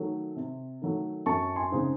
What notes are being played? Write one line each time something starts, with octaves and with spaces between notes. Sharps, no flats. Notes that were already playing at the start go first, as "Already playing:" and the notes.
Already playing: D#3 F#3 A3
C3
D#3 F#3 A3
F#2 A5 C#6
G#5 C6
C#3 G#3 C4 D#4